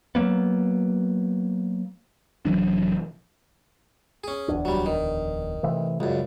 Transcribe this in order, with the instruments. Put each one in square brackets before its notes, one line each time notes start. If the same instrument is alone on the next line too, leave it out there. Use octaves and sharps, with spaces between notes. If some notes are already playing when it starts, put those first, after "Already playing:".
[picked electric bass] F#3 A#3 B3
F1 E3 F#3 D4
[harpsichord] C#4 G#4
[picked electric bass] D1 E2 D4
[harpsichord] F#3 G3
D#3
[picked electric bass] C3 E3 A3
[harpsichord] C#2 F#2 [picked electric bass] G3